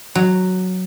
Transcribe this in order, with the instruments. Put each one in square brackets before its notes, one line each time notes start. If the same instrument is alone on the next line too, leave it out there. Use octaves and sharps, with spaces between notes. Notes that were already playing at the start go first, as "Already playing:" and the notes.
[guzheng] F#3